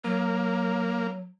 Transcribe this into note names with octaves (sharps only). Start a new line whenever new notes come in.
F#3 A#3